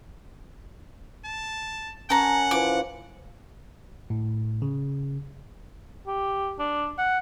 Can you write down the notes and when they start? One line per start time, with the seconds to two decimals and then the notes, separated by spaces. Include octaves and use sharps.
1.25 A5
2.10 C#4 A#4 C#5 F#5 A5 A#5
2.51 E3 F3 D6
4.10 A2
4.62 C#3
6.07 G4
6.59 D4
6.98 F#5